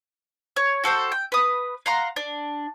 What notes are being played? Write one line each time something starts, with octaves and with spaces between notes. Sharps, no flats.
C#5
F#4 A4 C5 G5
G5
B4 D#6
F5 F#5 A#5 C6
D4